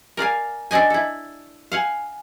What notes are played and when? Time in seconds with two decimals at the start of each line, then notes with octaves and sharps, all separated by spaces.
0.17 A#4 D5 F5 G#5
0.71 D4 A4 D5 D#5 G#5
0.90 E4 A4
1.72 F5 F#5 G#5